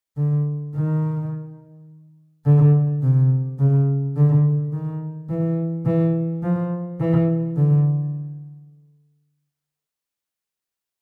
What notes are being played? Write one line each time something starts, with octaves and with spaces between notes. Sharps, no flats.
D3
D#3
D3
C3
C#3
D3
D#3
E3
E3
F3
E3
D3